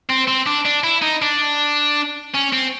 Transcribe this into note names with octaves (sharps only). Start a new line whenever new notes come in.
C4
C4
D4
D4
E4
D#4
D4
C#4
C4